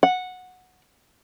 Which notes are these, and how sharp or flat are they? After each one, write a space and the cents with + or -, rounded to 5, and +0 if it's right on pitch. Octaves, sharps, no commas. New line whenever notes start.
F#5 -10